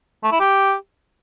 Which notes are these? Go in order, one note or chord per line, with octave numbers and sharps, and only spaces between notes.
A3
E4
G4